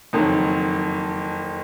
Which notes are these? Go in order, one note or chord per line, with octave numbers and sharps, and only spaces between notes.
F#1 F2 D#3 F#3